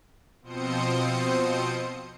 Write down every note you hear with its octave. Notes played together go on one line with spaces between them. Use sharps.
B2 F3 C4 C5 D#6 C#7